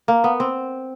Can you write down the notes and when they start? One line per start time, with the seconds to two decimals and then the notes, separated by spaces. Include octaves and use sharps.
0.08 A#3
0.24 B3
0.40 C4